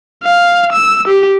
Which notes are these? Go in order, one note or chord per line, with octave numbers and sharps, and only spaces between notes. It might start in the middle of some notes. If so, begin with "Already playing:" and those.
F5
E6
G4